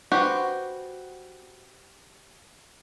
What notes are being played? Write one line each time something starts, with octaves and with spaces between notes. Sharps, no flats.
F#4 G4 B4 C5